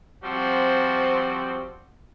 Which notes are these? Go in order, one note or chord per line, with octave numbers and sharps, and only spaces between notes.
F3 G3 C4 F#4